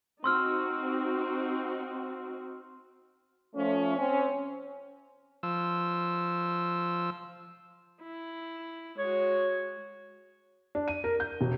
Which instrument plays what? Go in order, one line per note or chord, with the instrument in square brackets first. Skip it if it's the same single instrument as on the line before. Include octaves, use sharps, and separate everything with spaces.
[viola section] C4 D#4 F#4 [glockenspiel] C6 E6 F6
[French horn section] F3 A3 C#4
C4 C#4
[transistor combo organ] F3 E6
[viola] E4
[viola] G#3 F#4 [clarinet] C#5
[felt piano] D4
D#7
A#4
G6
E1